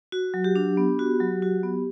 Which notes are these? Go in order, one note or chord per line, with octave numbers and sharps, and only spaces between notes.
F#4
F#3
G4
D4
B3
F#4
F#3
F#4
B3